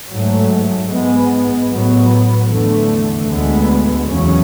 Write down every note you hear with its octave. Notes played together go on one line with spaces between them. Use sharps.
G#2 F#3 A3
G#2 G#3 B3
A2 F#3 B3
E2 D3 A3
D2 D3 G#3 B3
E2 C#3 F#3 C#4